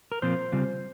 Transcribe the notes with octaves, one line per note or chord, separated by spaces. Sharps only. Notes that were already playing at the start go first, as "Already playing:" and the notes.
A#4
A#2 F3 C4 F4 C5
C#3 G3 C4 F4